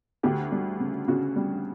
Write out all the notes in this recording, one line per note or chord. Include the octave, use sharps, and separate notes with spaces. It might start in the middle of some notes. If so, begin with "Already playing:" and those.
D2 G4
G3
C#3
C#3 F#4
G3